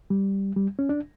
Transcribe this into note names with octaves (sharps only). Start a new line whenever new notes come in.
G3
G3
C#4
D4